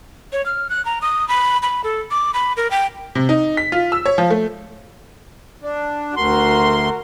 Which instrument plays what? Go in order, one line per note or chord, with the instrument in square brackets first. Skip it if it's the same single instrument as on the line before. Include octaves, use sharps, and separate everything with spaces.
[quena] C#5
F6
F#6
A#5
D#6
B5
B5
A4
D6
B5
A#4
G5
[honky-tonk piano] C3
D#4
B6
F4
E6
C#5
F3
A3
[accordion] D4
[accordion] D2 C6 [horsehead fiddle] F#4 A#4